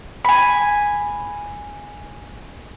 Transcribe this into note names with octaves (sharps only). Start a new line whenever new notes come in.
G#5 B5